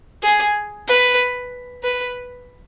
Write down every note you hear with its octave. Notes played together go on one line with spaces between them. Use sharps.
G#4
B4
B4